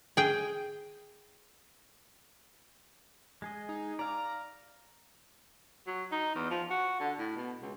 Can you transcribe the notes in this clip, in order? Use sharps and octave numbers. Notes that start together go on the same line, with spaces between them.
G#4 G5
G#3 G#4 D#5
D#4
D5 F5 A#5 D6
F#3
D#4
E2
F3
F#4
D3
A2
B2
C#2